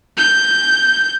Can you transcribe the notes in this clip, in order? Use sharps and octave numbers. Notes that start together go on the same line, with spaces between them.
G6